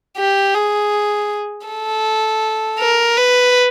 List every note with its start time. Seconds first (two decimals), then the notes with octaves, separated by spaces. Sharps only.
0.18 G4
0.55 G#4
1.67 A4
2.79 A#4
3.17 B4